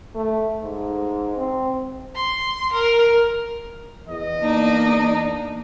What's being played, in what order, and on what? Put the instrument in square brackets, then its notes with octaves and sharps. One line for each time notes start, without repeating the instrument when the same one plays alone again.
[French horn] A3
G#2
C4
[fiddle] C6
A#4
[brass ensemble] E2 D#5
[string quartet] A#3 D4 D#4